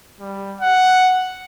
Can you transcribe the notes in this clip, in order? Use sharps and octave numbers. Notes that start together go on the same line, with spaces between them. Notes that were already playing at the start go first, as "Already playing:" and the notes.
G3
F#5